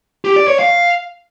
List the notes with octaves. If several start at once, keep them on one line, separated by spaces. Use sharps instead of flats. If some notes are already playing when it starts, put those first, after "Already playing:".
G4
D5
C#5
F5